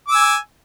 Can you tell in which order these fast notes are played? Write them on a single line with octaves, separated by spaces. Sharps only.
D6 E6 G#5